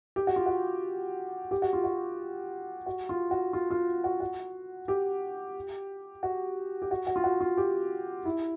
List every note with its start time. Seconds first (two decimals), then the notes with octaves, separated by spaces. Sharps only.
0.16 G4
0.27 F#4
0.36 F4
0.46 F#4
1.51 G4
1.62 F#4
1.73 F4
1.84 F#4
2.86 F#4
3.09 F4
3.31 F#4
3.53 F4
3.71 F4
4.04 F#4
4.20 F#4
4.88 G4
6.23 F#4
6.82 G4
6.91 F#4
7.07 F#4
7.16 F4
7.24 F#4
7.41 F4
7.57 G4
8.25 E4